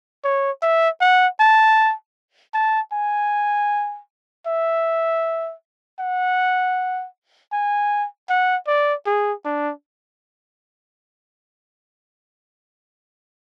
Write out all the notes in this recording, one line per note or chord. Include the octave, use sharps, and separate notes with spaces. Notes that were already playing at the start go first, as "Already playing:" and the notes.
C#5
E5
F#5
A5
A5
G#5
E5
F#5
G#5
F#5
D5
G#4
D4